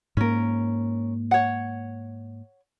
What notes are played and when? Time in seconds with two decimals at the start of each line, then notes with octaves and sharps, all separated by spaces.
0.17 G#2 A#3 C#4 A#4
1.31 C#5 F#5